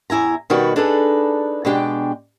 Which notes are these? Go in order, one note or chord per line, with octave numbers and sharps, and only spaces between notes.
E2 E4 G#5 A#5
B2 D#3 G3 F#4 B4
D4 D#4 G#4 A4 B4
B2 G#3 D4 G4 G5